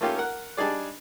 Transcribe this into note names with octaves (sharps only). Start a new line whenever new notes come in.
A3 A#3 C#4 F4 G4 A4
A#4 F#5
G3 D4 D#4 G#4 D5